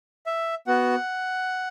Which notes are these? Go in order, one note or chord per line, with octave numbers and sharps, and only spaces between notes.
E5
B3 F#4 F#5